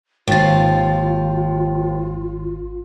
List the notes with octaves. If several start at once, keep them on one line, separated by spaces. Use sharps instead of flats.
G#1 D#2 G#2 D#3 F3 F4 A6